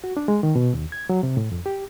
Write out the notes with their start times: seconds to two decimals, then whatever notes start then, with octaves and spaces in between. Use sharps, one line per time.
0.04 F#4
0.17 D4
0.28 G#3
0.43 D#3
0.56 B2
0.74 D#2
0.92 G#6
1.09 F#3
1.23 C3
1.37 A2
1.52 F2
1.66 G4